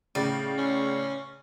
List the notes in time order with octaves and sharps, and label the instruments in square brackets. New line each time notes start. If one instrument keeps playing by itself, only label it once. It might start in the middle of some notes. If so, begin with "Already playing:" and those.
[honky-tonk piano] A2 C#3 [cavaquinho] D5
[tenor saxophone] C#4